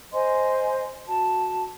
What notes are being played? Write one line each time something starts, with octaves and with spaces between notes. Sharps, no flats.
C5 D#5 G#5 C6
F#4 A5